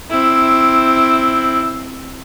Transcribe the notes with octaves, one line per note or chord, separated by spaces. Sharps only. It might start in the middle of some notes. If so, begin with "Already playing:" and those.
C4 E4